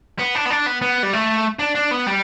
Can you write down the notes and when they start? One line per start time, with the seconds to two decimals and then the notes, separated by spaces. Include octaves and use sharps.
0.19 B3
0.35 D4
0.46 B3
0.50 D4
0.66 B3
0.82 B3
1.03 G3
1.13 A3
1.59 D4
1.75 D4
1.91 B3
2.07 G3